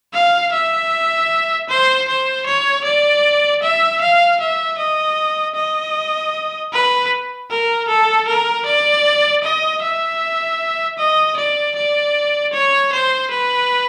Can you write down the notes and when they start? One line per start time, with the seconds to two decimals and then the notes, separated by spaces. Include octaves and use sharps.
0.13 F5
0.53 E5
1.69 C5
2.08 C5
2.46 C#5
2.84 D5
3.63 E5
4.01 F5
4.40 E5
4.78 D#5
5.56 D#5
6.73 B4
7.50 A#4
7.88 A4
8.27 A#4
8.65 D5
9.43 D#5
9.82 E5
10.98 D#5
11.36 D5
11.76 D5
12.53 C#5
12.93 C5
13.31 B4